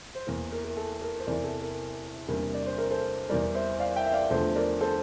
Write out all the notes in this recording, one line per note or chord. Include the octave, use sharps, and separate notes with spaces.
C5
E2 E3 A#3 A#4
A#4
A#4
A4
A#4
C5
E2 C3 E3 A#4 D5
A4
A#4
E2 C3 G3 A#3 D4 A#4
D5
C5
A#4
A4 C5
E2 E3 G3 A#4 D5
C5 E5
D5 F5
E5 G5
E5
D5 F5
E2 D3 F3 A3 A4 C5
A#4 D5
A4 C5